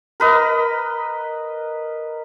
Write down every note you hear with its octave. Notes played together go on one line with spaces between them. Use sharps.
A#4 B4 D#5